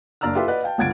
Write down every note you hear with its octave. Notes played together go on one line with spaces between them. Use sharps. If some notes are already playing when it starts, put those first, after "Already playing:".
F#1 D4 D5 A#5 E6 F6
E4 F4 G4 A4 B4 E5
B4 D5 D#5 F#5
F5 G5 A5
G1 C#2 F#5 G#6 A6 D7